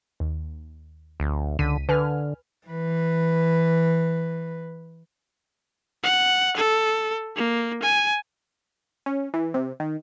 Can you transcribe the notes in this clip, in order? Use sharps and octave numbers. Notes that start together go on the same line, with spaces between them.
D#2
D2
C#2 D3 B6 D#7
D3 B4 G#5 F6
E3 B4
F#5
A4
A#3
G#5
C#4
E3
C3
D#3